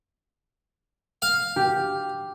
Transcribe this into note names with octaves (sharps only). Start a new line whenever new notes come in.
F5
G4